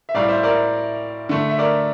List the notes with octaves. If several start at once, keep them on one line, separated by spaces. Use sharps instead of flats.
E5
A2 G3 D5 F5
C5 E5
A#4 D5
D3 A3
E5
A#4 D5